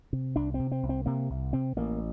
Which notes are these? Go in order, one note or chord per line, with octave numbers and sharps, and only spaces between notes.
C3
C2 D4
C4
C3
C4
C2
C4
C3 A#3
C2
C3 C4
A1 A#3